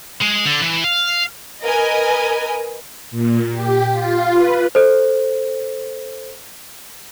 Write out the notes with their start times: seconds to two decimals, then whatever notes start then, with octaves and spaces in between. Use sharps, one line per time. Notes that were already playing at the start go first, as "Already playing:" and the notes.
0.22 G#3
0.46 D3
0.61 E3
0.84 F5
1.64 A#4 B4 D#5 G#5
3.11 A#2
3.50 G4
3.90 F4
4.33 B4
4.75 A4 C5